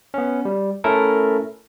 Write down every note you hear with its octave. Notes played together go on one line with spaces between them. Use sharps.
B3 C#4
G3
A3 C#4 E4 A4 A#4